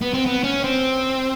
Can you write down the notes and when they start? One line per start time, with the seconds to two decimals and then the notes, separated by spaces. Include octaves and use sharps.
0.02 B3
0.14 C4
0.26 B3
0.44 C#4
0.64 C4